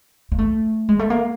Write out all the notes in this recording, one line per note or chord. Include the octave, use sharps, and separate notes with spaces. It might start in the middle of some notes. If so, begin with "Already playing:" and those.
A#3
A3
G#3
A3
A#3